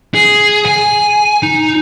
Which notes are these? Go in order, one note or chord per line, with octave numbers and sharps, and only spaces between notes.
G#4
G#5
D#4